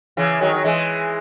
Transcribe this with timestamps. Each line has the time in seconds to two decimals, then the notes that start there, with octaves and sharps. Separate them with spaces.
0.17 C#3 E3
0.41 D#3 F#3
0.53 F#3
0.64 E3 G#3